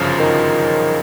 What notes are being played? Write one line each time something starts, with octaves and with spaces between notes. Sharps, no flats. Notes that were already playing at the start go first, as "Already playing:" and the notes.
Already playing: G1 F#2 C#3 F3
D#3